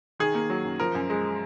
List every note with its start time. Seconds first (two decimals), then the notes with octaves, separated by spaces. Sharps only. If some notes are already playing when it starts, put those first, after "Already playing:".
0.19 D#3 G#4
0.35 A#3
0.50 F#3
0.65 F#2
0.80 F3 A#4
0.95 F#2
1.10 G#3